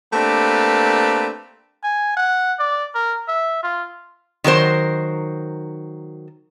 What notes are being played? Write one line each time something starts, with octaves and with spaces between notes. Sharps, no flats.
A3 A#3 C4 D4 G4 B4
G#5
F#5
D5
A#4
E5
F4
D#3 F#3 A#4 C5